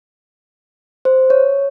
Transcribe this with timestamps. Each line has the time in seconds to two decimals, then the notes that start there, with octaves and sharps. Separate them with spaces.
1.05 C5
1.30 C#5